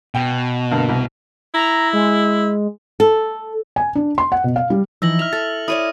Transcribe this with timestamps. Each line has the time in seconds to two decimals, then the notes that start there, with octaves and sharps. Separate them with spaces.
0.15 B2 G5
0.71 G2 D3 A#3
0.89 C2
1.54 E4 A#5
1.93 G#3
3.00 A4
3.76 G#5
3.95 D4
4.18 C6
4.32 F#5
4.44 B2
4.56 F5
4.70 G3
5.02 E3 F3 D#4 E4 E6 A#6 F#7
5.19 E5 F6 F7
5.33 A4 A6
5.68 E4 C#5 D5 D#6 D#7